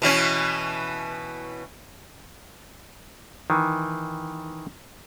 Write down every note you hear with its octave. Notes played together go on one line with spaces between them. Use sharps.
B2 E3 C#4
D#3 E3